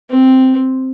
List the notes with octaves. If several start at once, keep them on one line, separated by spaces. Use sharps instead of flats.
C4